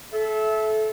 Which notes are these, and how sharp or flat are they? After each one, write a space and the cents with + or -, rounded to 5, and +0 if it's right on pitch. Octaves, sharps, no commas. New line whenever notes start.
A4 -25 E5 +0